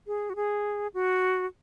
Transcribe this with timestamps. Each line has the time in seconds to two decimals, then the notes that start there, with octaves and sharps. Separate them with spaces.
0.07 G#4
0.30 F#4
0.36 G#4
0.94 F#4